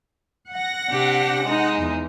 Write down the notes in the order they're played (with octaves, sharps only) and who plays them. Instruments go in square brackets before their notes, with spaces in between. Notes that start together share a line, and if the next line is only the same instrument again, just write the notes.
[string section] F#5 A#6
[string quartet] C3 D4 G4
G#3 D#4
[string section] E2